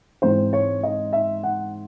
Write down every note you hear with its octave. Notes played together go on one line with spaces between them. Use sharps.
G#2 E3 C4 C5
C#5
D#5
E5
F#5